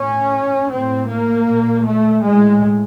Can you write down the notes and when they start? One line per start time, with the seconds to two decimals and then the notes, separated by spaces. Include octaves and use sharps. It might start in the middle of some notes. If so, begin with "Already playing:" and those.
Already playing: A2 C#4
0.69 A2 C4
1.07 A#3
1.45 A#2
1.84 A3
2.23 A2 G#3